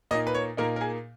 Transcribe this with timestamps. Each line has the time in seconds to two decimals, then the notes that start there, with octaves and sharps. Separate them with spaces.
0.11 A#2 A#3 D#4 D#5
0.27 B4
0.35 C#5
0.57 A#2 A#3 D#4 A#4
0.76 A#4
0.81 G#4